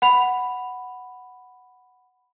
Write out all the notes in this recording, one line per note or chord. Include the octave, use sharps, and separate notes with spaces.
F#5 B5 F7